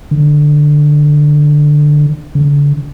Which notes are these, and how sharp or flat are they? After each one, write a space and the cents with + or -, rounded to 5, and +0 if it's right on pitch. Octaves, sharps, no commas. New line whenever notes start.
D3 +10
D3 -35